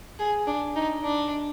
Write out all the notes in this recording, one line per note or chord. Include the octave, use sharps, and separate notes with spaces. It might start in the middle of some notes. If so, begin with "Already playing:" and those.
G#4
D4
D#4
D4